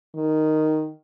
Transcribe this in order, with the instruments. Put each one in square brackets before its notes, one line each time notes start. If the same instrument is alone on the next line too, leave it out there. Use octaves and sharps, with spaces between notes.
[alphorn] D#3